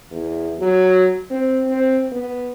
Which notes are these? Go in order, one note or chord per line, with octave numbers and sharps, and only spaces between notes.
E2
F#3
C4
C4
B3